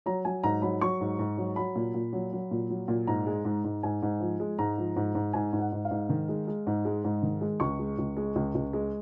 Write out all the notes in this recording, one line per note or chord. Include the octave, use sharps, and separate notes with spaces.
F#3 A#5
F#3 G#5
G#2 A#5
F#3 B5
F#3 C#6
G#2
G#2
F#3
F#3 B5
A#2
A#2
F#3
F#3
A#2
F#3
A#2
G#2 A#5
G#3
G#2
G#2
G#2 G#5
G#2
F3
G#3
G#2 A#5
F3
G#2
G#2
G#2 G#5
G#2
F#5
G#2
F5
G#2
D#3
G#3
G#3
G#2
G#3
G#2
D#3
G#3
C#2 C#6
G#3
C#2
G#3
C#2
C#2
G#3